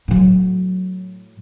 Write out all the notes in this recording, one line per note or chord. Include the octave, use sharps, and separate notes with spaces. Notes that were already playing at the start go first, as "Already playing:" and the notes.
A2 F#3